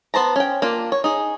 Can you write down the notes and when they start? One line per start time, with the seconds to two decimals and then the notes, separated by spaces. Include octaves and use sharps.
0.14 B3 C5 A5 A#5
0.36 C#4 G5
0.62 A#3 D4 F4
0.92 C#5
1.04 D#4 G#4